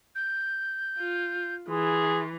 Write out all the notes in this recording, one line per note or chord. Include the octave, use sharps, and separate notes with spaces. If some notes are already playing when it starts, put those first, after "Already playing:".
G6
F4
E3 G#4 C6